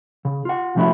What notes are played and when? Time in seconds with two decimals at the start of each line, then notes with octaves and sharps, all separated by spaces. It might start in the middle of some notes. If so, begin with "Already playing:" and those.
0.25 C#3
0.45 F4 F#5
0.75 C2 F3 A3 C#4 E4 F#4